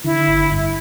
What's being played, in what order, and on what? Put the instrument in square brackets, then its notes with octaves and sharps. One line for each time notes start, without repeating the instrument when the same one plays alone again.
[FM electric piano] D3 [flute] E4
[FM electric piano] G1
G2